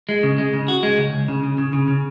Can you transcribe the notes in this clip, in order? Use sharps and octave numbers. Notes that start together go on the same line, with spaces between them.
G#3
C#3
G#3
C#3
F#4
G#3
C#2
C#2
C#3
C#3
C#3
C#3
C#3